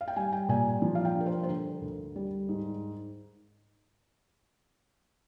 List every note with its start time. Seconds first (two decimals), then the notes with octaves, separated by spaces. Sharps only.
0.01 F5
0.08 G5
0.16 G3 G#5
0.33 G5
0.49 A#2 G#5
0.82 F3
0.95 F5
1.05 G5
1.15 G2
1.21 A#4
1.26 C5
1.43 C5
1.49 D3 A#4
1.81 D2
2.16 G3
2.49 G#2